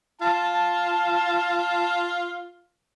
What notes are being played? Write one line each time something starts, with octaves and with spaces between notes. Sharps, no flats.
F4 A5